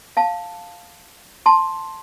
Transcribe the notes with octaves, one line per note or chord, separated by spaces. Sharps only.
F5 A5
A5 C6